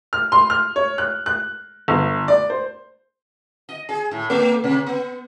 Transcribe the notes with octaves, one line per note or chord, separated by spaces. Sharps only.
F6
C6
F6
C#5
F#6
F#6
G1
D5
C5
D#5
G#4
A2
A3
C3
B3